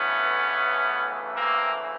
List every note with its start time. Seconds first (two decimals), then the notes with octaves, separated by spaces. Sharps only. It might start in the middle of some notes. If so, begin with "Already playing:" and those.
Already playing: D2 C#3 E3 A3 B3 C#4
1.34 A#3 C4